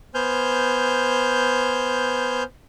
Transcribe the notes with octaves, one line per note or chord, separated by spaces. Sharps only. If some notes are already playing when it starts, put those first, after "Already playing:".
B3 C5 G#5 F6 G6